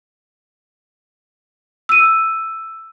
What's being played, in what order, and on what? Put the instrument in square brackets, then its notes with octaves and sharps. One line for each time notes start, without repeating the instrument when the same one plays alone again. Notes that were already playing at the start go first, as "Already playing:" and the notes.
[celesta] E6 D#7